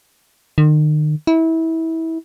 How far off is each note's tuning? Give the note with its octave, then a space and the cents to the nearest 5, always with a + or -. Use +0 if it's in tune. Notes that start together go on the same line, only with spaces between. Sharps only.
D#3 -40
E4 -25